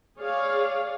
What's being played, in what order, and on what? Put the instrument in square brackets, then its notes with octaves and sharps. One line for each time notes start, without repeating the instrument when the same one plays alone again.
[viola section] G#4 C#5 D5 F5